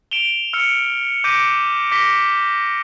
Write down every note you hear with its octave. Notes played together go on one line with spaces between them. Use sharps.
D7 E7 F7 G7
E6 F6 C#7
D6 G6 A#6 B6 D7 D#7
D6 A#6 B6 G7